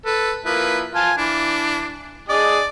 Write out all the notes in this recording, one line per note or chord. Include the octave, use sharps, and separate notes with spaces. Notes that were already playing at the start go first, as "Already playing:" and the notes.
A4 B4
F3 A#3 E4 B4
F4 F5 G#5 A5
E3 D4
D4 G#4 D5 D#5